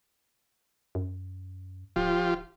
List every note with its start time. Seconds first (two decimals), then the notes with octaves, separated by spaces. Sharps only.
0.95 F#2
1.96 D1 F3 F4 G4